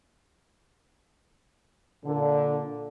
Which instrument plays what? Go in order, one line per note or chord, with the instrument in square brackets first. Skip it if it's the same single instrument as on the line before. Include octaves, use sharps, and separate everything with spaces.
[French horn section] A#2 D3